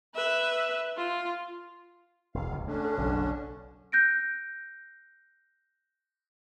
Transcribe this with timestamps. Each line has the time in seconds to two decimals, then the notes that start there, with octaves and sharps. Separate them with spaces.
0.15 B4 E5
0.96 F4
2.34 E1 E2 F5
2.52 C#2 G2
2.67 D3 A3 C#4 D4
2.85 A4
2.97 F#1 B1
3.92 F#6 G6 A#6 D7